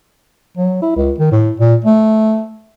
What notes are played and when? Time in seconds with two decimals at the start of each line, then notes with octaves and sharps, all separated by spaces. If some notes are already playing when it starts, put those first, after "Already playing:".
0.57 F#3
0.82 E4
0.96 C#2
1.19 D#3
1.32 A2
1.60 A#2
1.85 A3